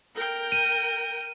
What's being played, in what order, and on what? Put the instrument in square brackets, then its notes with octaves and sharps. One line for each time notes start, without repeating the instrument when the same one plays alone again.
[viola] A#4 G5
[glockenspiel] D#7